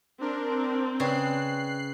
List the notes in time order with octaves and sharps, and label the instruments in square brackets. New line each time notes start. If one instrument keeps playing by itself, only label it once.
[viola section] C4 [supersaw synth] D4 A#4
[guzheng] C#3 [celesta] B4 D5 G5 [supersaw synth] F#6 C7